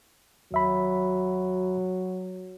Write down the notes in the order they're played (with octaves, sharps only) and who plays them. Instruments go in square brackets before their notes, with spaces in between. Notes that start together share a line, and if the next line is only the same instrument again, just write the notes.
[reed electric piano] D#2 E5 B5 [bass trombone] F#3